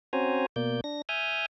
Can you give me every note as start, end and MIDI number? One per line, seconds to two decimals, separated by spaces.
0.13 0.46 60
0.13 0.46 61
0.13 0.46 66
0.13 0.46 72
0.13 0.46 80
0.13 0.46 82
0.56 0.81 47
0.56 0.81 58
0.56 0.81 74
0.56 0.81 91
0.84 1.02 62
0.84 1.02 94
1.09 1.46 76
1.09 1.46 80
1.09 1.46 87
1.09 1.46 89
1.09 1.46 91